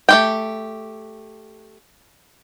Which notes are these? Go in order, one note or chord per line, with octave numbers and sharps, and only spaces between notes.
A3 G4 G5